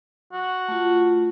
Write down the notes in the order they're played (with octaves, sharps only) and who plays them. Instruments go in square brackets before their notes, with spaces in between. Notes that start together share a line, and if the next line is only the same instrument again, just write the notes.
[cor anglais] F#4
[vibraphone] A3 F4